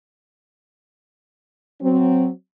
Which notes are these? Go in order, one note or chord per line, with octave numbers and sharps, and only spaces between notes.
F#3 C4